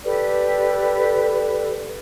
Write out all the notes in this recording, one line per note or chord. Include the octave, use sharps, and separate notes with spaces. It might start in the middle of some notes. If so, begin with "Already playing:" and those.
G4 A4 B4 D5